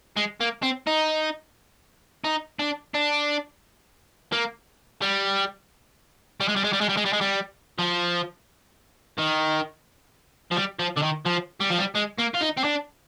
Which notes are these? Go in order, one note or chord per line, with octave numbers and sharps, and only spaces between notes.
G#3
A#3
C4
D#4
D#4
D4
D4
A#3
G3
G3
G#3
G3
G#3
G3
G#3
G3
G#3
G3
G#3
G3
F3
D#3
F3
G3
F3
D3
D#3
F3
G3
F3
G3
G#3
A#3
F4
D#4
C4
D4